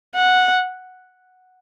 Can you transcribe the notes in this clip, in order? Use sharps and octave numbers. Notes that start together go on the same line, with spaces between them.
F#5